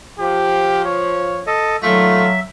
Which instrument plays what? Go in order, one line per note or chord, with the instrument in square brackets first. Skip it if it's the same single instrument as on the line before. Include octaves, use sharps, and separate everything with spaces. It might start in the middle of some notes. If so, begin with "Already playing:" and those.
[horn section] F3 [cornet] G4
[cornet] C#5
[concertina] A4 D#5
[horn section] A#2 D#3 A3 [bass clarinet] F#3 [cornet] F4 [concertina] E5